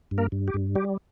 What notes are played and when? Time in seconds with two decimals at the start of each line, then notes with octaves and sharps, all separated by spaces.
0.11 G2
0.18 A#3 A#4
0.32 G2
0.48 G4
0.54 G2
0.75 G3 G4